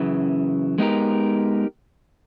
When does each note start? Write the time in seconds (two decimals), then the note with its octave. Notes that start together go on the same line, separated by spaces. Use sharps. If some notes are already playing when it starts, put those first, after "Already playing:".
Already playing: F#2 C#3 E3
0.78 G#3 B3 D#4 G4 A#4